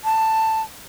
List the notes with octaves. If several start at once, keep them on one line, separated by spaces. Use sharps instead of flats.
A5